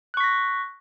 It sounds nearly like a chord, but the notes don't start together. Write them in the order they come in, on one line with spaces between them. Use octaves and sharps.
F#6 C#6 B6 A#6